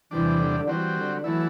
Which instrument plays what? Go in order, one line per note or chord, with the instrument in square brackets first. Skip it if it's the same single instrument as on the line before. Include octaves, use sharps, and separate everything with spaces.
[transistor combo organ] E2 C3 G3 D4 [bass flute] E3
[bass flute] D3
D3
[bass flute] E3 [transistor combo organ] G3 C4 F#4
[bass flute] D3
[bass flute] E3 [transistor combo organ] F#3 A3 E4